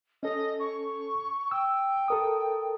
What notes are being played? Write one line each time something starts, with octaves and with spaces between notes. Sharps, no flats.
C#4 A4 D#5
C#6
G5 E6
A4 A#4 D#6